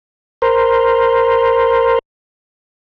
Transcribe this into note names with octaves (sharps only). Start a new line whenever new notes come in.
A#4 C5